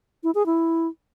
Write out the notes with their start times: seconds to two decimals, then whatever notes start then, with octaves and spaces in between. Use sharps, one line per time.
0.24 E4
0.35 G#4
0.46 E4